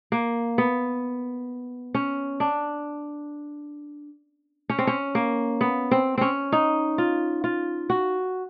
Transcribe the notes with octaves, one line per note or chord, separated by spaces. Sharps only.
A#3
B3
C#4
D4
C#4
C4
C#4
A#3
B3
C4
C4 C#4
D#4
F4
F4
F#4